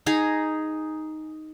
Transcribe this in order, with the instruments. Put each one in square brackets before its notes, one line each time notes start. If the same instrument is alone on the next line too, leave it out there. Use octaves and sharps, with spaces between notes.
[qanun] D#4 G#4 A#5